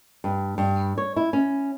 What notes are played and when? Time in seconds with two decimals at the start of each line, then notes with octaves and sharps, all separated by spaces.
0.24 G2
0.58 G2
0.98 C#5
1.16 E4
1.33 C#4